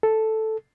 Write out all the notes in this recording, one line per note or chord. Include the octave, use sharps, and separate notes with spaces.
A4